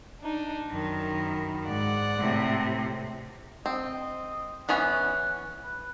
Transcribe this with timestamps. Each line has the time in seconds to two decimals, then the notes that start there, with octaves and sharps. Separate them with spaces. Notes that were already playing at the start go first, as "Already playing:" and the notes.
0.21 D4 D#4
0.70 F#2 D#3 E4
1.65 G#2 D5 F#5
2.19 A2 C3
3.66 C4 D#5
4.69 E3 B3 C#4 F#5
5.64 B4